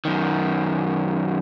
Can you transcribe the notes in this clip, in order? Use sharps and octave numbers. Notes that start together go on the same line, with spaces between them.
F#2 D#3